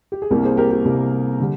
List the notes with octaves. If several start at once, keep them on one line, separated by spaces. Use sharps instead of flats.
G4
G#4
C2 C3 G3 A#3 G4 A#4
G#4 C5
G4 A#4
G4
C2 C3 G3 A#3
D3 G3